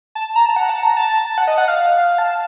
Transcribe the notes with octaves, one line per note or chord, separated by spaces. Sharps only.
A5
A#5
A5
F#5
A5
A#5
A5
F#5
D#5
F#5
F5
A5